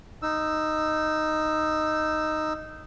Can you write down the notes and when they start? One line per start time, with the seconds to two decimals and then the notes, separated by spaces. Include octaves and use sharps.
0.22 D#4 E6